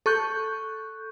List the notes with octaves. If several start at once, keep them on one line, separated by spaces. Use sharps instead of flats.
A4 C#6 F#6 G6